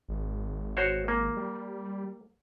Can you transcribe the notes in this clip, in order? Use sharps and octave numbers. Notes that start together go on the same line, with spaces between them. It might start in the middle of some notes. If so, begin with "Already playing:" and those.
G#1
F#4 C5 C#5
A#3
G3